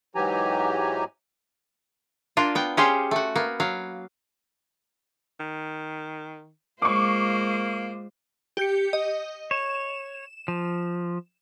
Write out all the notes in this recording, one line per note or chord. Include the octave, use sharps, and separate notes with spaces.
G#2 E3 F#3 G4 G#5 A#5
A#3 D4 F4
B3 G5
C#4 F4 G4 G#4 C5
A3 F#4
A#3 B3
F#3 F5
D#3
G#3 A#3 F4 C5 C#6 D6
G4 G6 C#7
D#5
C#5 E7
F3